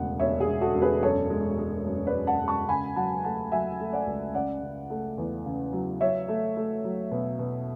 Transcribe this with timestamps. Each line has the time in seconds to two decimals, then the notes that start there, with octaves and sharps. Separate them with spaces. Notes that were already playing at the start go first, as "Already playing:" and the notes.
Already playing: E1 D2 C#3 F#5
0.20 E1 C#5 E5
0.40 G#4
0.47 E1
0.61 F#4 A4
0.75 E1
0.82 G#4 B4
1.03 F#2 A4 C#5
1.30 G#3
1.58 G#3
1.86 F#2
2.06 B4 D5
2.13 F#2
2.27 F#5 A5
2.41 G#3
2.48 A5 C#6
2.69 C#3 G#5 B5
2.96 F#3 F#5 A5
3.24 A3 F#5 A5
3.52 F#3 E5 G#5
3.80 A3
3.93 D5 F#5
4.07 C#2
4.34 C#3 D5 F#5
4.63 C#3
4.90 A3
5.18 E2
5.45 C#3
5.73 F#3
6.01 F#3 C#5 E5
6.28 A3
6.56 A3
6.84 F#3
7.11 B2
7.39 B2